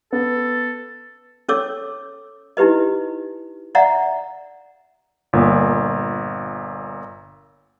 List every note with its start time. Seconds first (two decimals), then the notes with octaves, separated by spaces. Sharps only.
0.13 B3 A4
1.49 C#4 A4 C#5 D6 E6
2.57 D#4 E4 G4 B4 D#5
3.75 D5 E5 F#5 A#5
5.33 G1 A#2